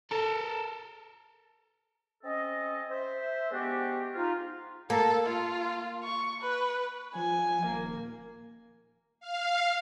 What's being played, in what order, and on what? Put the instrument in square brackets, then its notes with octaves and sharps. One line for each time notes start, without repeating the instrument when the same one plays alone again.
[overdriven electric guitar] A4 A#4
[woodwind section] C4 C#4 A4 D#5
C5 E5
G#3 B3 D4 F#4 G4
G#2 D#4 F4
[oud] A#3 [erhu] A4
[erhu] F4
C#6
B4
[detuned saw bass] F3 [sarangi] G#5
[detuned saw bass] D#1 [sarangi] A#3
[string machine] F5